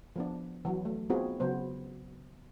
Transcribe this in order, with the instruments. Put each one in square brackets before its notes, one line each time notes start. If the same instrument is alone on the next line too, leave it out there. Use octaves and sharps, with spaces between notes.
[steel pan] F3 B3 D4
E3 F#3
A3
B3 C4 D#4 F4 F#4 G#4
C#3 F#3 B3 C5